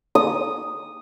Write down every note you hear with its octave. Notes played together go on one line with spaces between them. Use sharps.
D#6